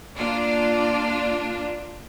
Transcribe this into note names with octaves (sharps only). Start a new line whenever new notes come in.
A#3 D4 F4